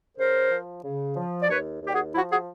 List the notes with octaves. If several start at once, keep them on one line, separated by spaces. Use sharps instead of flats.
C#3 A#4 C5
F3
C#3
F3
D5
D#2 B4 C#5
D#2
G4
F#4 G#4
F3 E4 F#4
F#4 G#4